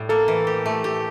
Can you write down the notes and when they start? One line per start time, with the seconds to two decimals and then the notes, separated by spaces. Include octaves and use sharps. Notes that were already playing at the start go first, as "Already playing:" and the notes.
Already playing: A2 G3
0.09 A#3 A4
0.28 E3
0.47 G4
0.66 A3
0.84 G4